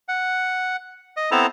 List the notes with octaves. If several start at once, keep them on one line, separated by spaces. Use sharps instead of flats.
F#5
D#5
B3 C4 E4 A4 A5 A#5